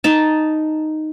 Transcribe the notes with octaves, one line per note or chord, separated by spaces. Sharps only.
D#4 A5